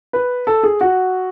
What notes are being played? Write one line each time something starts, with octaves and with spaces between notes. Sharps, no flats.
B4
A4
G#4
F#4